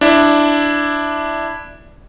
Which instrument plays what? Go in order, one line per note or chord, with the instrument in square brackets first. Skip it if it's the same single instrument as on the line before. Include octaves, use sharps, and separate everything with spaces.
[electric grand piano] D4 E4